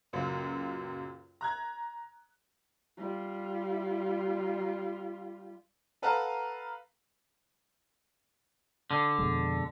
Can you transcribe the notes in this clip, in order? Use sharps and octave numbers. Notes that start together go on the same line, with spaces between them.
C#2 F#2 A#2 F#3
A#5 F#6 G#6
G3 F4
A4 B4 F5 F#5 A5 A#5
D3
F2 B2 G#3